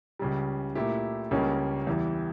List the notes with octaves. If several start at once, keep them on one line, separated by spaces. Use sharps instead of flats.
C#2 C#3 G3
A#2 A3 E4 G4
C#2 C#3 G3 A#3 C#4
E2 E3 G3